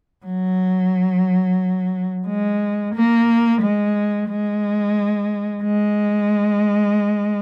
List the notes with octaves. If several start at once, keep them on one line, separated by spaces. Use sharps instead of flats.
F#3
G#3
A#3
G#3
G#3
G#3